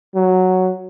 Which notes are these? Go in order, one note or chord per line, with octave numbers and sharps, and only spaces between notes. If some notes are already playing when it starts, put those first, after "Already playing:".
F#3